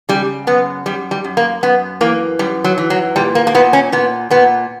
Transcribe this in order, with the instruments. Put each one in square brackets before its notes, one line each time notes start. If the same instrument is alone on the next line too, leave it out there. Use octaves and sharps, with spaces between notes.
[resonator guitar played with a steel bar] C#3 G3
F#2 B3
F#2 G3
G3
F#2
A#3
F#2 B3
E3 A#3
F#2 G3
F#3
E3
F#3
A#2 G3
A#3
A#3
A#2 B3
C#4
A#2 B3
A#2 B3